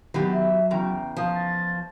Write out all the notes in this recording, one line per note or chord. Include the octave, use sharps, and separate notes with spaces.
D#3 F#3 B3 G4
E5
E2 C#3 G5 A#5
F3 D#6
A6